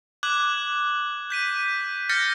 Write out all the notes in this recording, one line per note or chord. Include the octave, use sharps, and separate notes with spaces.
D6 F#6 G#6 F#7
G6 B6 D#7
F6 G6 A6 A#6 C#7